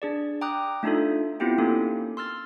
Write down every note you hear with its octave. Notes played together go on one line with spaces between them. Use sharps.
D4 G#4 D5
G5 A#5 D6 D#6 F#6
A3 D4 D#4 F4 A4
B3 C4 E4 F4 G4 G5
A#3 C#4 D#4 A4
C6 E6 F6 A6